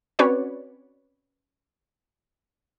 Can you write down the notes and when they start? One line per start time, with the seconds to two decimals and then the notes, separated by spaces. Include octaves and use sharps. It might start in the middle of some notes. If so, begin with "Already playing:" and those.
0.19 C4 C#4 F#4 B4 C#5 D5